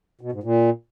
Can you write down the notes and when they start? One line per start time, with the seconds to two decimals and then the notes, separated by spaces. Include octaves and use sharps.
0.21 B2
0.32 G#2
0.43 A#2